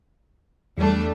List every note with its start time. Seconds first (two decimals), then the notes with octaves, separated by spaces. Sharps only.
0.78 E2 G3 A3 D4